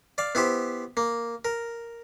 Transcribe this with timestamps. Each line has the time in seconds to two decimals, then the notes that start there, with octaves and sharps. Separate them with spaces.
0.18 D5 F5
0.35 B3 E4 G4 C5
0.97 A#3
1.45 A#4